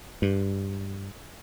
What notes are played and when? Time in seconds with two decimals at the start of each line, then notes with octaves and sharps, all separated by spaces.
0.22 G2